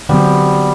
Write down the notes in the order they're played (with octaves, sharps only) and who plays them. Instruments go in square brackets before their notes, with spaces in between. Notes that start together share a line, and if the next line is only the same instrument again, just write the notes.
[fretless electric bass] D3 F#3 C4 [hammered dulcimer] G3 B3